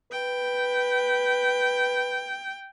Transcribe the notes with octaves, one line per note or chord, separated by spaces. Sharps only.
B4 G5